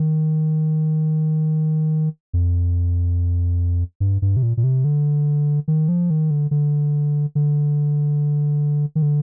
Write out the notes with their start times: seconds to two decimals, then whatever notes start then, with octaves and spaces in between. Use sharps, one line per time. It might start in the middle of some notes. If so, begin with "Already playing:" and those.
Already playing: D#3
2.33 F2
4.00 G2
4.22 G2
4.37 C3
4.43 A#2
4.57 A#2
4.64 C3
4.84 D3
5.68 D#3
5.88 F3
6.10 D#3
6.31 D3
6.51 D3
7.35 D3
8.95 D#3
9.02 D3